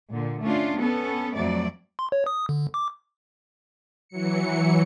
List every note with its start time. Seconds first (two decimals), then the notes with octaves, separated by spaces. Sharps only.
0.10 A#2 D3
0.43 A3 C#4 D4 F4
0.77 B3 C#4 A4
1.33 F2 F#3 A3 D5
1.99 C6
2.12 C#5
2.26 D#6
2.49 D3
2.74 D6
4.08 E3 F#3 C#7